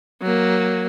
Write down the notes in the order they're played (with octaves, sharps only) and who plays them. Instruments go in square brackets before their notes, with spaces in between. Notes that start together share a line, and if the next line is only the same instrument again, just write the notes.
[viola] F#3 A#3